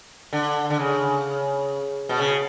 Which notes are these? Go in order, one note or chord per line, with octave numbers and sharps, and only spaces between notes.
D3
D3
C#3
B2
C#3